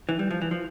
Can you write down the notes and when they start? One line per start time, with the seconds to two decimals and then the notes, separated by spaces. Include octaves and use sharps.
0.09 E3
0.19 G3
0.31 F3
0.42 E3
0.51 F3